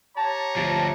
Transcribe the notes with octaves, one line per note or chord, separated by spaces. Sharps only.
G4 C#5 A5 A#5
D2 F3 A5